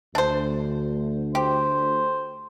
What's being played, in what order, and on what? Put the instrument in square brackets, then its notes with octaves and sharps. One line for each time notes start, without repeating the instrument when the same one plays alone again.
[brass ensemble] D2 [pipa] D4 C5
[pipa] G4 [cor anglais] C5